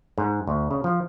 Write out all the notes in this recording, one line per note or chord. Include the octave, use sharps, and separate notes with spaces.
G#2
D2
C#3
F3